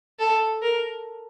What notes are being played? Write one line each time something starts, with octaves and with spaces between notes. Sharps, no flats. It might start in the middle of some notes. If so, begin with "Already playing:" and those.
A4
A#4